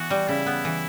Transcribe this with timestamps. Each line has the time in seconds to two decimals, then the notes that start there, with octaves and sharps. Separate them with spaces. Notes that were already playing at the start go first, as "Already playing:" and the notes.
Already playing: E3 B3 F#4
0.10 G3
0.28 C#3 E4
0.46 B3
0.65 E3